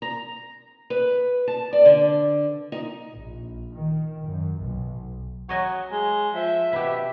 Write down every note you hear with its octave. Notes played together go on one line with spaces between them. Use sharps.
A#5
B4
A5
D5
D3
D#4
A#1
D#3
F#2
B1
F#3 C#5 D#5 G#5
G#3
F3 E5
B2 E4 G4